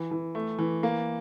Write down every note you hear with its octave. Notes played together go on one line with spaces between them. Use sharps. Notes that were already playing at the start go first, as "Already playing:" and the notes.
Already playing: E3
E3
A3
E3
A#3